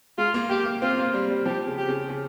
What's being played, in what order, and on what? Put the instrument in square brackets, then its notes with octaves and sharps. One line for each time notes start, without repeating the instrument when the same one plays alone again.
[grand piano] G#3 [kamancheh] F4
[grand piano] A#3
[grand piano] A#3 [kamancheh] G4
[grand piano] A#3
[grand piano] C4 [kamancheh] F4
[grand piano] A#3
G3
G3
[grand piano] F3 [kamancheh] G4
[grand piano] C#3
[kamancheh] G4
[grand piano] C#3
C#3